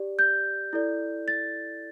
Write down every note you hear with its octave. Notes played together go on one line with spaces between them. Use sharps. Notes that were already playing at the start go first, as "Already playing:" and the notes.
Already playing: G4 D5
G6
E4 A4 D5
A6